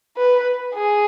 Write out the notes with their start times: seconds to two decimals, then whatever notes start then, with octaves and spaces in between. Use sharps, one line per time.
0.17 B4
0.75 G#4